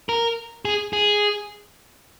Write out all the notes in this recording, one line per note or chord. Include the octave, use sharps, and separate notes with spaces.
A#4
G#4
G#4